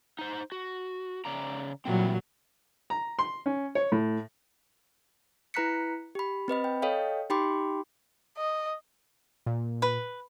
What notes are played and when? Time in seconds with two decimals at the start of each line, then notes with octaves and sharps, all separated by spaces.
0.19 D#4 C5
0.52 F#4
1.25 C#3 D5 A#5
1.85 A#2 E3 F#3 G3 C4
2.90 A#5
3.19 C6
3.46 C#4
3.75 C#5
3.92 A2
5.54 E4 B4 A#5 F#6 B6 C#7
6.15 G4 B5
6.48 C4 B4 D#5 B5
6.64 G5
6.82 A4 C#5 D#5 F5 G5
7.30 D#4 G4 G5 B5 C6 D6
8.37 D#5
9.46 A#2
9.82 B4